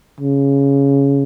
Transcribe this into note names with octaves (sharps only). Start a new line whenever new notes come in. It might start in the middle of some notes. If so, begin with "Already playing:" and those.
C#3